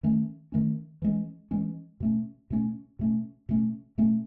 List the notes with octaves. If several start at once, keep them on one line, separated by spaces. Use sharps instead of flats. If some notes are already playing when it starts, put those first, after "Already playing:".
D#3 A3 C#4
D#3 A3 C#4
E3 G#3 C#4
E3 G#3 C#4
B2 A3 C#4
B2 A3 C#4
B2 A3 C#4
B2 A3 C#4
B2 A3 C#4